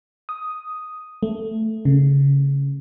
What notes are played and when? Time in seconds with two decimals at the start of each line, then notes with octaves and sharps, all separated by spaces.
0.29 D#6
1.23 A3
1.85 C#3